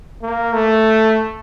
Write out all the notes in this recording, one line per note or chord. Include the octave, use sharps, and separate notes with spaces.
A#3
A3